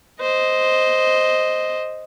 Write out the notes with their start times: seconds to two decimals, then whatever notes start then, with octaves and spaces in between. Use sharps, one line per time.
0.21 C5 D#5